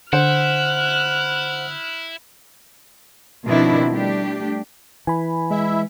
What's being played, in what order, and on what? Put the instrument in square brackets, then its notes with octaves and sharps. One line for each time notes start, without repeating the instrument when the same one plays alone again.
[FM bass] D3 [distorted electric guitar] E4 [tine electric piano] C5 F#5 [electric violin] F6 F#6
[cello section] B2 D#3 F3 C4 D4 E4
G3 A3 D4 G4
[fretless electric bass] E3 [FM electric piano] G#5 B5
[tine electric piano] G#3 [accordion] E4 E5